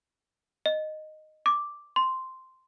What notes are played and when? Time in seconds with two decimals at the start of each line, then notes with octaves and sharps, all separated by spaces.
0.66 D#5
1.46 D6
1.96 C6